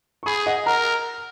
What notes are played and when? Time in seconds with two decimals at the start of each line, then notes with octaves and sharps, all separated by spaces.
0.23 C#6
0.26 G#4 B5 D#6
0.46 D#5 F#5
0.66 A#4 F#5 A#5